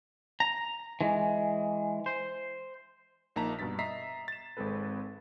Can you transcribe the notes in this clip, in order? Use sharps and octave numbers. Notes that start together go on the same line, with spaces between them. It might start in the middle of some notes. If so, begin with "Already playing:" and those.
A#5
E3 G#3
C5
A#1 A#3 D#4 A5 A#5 B6
G2 B2 A6 B6
D#5 E5 A#5 B6 C7
A6 E7
G#1 G#3 C4 A4 B4